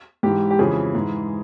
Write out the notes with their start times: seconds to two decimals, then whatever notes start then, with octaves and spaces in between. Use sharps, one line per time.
0.23 G#2 E3 G4
0.50 G4
0.59 F2 C#3 E3 G#4
0.95 G#2 E3